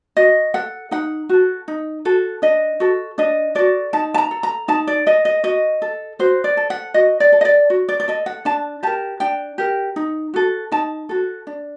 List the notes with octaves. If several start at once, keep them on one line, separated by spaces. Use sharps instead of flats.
F#4 D#5
A4 F#5
D#4 F#5
F#4 A4
D#4
F#4 A4
D4 D#5
F#4 A4
D4 D#5
F#4 A4 D5
D#4 A5
A5
A#5
A4
A#5
D#4 A5
D5
A4 D#5
D#5
F#4 D#5
A4
F#4 C5
D5
A4
F#5
F#4 D#5
D5
A4
D#5
D5
F#4
D5
D5
A4 D#5
F#5
D4 A5
G4 A#4 A5
D4 G5
G4 A#4
D#4
F#4 A4
D#4 A5
F#4 A4
D4